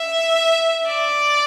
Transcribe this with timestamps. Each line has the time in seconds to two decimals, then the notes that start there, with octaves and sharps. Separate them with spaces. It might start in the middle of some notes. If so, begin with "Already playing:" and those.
Already playing: E5
0.87 D5